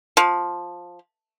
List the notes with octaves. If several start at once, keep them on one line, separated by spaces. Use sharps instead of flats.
F3